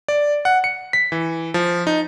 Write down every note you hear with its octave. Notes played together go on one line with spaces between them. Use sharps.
D5
F#5
C#7
B6
E3
F3
D#4